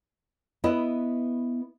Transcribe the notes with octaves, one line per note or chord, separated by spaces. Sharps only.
B3 E4 B4 D#5